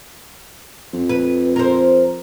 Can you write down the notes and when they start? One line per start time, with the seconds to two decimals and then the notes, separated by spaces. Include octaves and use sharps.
0.93 F2
1.09 B4
1.56 A#4 C5